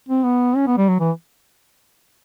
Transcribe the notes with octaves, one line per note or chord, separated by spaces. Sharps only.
C4
B3
C#4
B3
G3
F#3
E3